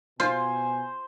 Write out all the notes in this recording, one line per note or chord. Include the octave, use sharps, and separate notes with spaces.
B2 F4 C5 G#5